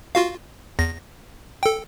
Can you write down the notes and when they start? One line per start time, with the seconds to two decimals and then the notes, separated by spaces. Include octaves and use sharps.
0.15 F4 F#4 F5
0.79 E2 A#6
1.63 A4 G5